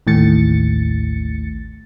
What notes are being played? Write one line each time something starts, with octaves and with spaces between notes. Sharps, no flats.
A1 D#2 A2 A6 C#7